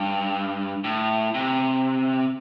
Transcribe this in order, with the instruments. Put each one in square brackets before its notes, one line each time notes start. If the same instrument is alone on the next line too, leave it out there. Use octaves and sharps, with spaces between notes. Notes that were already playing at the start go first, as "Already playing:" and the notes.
Already playing: [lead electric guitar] G2
A2
C3